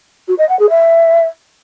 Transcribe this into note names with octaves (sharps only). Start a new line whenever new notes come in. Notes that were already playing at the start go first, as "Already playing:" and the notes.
F#4
D#5
F#5
G#4
E5